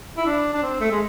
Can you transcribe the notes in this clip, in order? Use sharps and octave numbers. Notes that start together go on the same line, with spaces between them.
E4
D4
D4
C4
A3
G#3